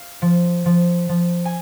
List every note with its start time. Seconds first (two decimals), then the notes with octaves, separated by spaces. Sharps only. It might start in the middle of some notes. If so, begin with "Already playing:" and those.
Already playing: F5
0.22 F3
0.65 F3
1.09 F3
1.45 G#5